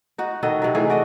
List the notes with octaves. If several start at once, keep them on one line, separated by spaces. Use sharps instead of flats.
D#4 F#4
D#3 F#4 A4 D#5
C3 F#3
E3 A3 G#4
F#4 D5 D#5